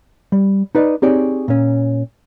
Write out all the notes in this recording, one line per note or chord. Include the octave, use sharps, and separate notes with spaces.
G3
D#4 B4 D5 D#5
C4 D#4 G4 G#4 C#5 D5
A#2 C#4